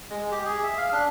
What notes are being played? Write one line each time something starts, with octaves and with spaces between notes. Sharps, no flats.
G#3
G4
G#4
E5
F5
D4